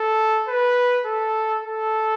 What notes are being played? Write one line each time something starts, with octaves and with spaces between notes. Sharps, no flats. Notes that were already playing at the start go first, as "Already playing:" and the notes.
Already playing: A4
B4
A4
A4